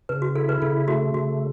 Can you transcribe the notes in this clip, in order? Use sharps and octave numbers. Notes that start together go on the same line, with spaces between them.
C#3 B4
F#4
E4 A4
B4
C#3 A4
A3 F#4
C#3 F#4